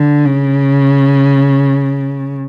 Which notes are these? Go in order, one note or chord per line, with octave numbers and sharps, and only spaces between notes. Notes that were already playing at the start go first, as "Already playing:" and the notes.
Already playing: D3
C#3